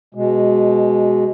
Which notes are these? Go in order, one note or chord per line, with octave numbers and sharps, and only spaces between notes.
B2 G#3